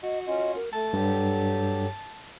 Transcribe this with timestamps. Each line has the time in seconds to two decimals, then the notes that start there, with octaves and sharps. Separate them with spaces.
0.03 F#4 D#5
0.27 C#4 F4 D#5
0.56 A#4
0.73 A3 A4 A5
0.93 G2 F#3 G4